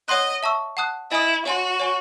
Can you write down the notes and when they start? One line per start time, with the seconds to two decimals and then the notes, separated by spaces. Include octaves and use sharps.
0.08 C#5 D#5 F#5 C6 F#6
0.43 E5 A5 C#6 E6
0.77 F#5 A5 D#6 F#6
1.11 E4 D#5 G#5 D#6
1.46 F#4 C#5 G#5 C6
1.80 C#5 G#5 C#6